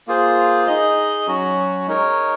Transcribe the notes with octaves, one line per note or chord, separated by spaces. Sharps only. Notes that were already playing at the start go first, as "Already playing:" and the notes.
A#3 F4 G#4 C5
D#4 G#4 D#5
F#3 C#4 F#4
G#3 D#4 A#4 C#5